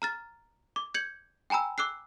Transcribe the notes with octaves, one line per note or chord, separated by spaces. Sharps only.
A#5 F6 A6
D6
G6 G#6 C#7 F#7
G5 G#5 A#5 B5 E6
D6 E6 F#6 C7